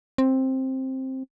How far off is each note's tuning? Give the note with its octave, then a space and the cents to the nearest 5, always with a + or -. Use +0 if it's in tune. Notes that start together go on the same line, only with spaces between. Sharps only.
C4 +10